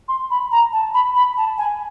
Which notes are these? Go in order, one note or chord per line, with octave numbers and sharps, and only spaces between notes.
C6
B5
A#5
A5
B5
B5
A5
G#5